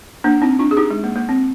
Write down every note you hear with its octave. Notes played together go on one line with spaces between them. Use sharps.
A#3 D4
C4 D#4
D4 F4
G#4
D#4 G4
G#3
A#3
A#3
C4